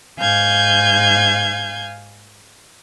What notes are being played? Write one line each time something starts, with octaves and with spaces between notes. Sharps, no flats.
G#2 F5 G#5 G6 G#6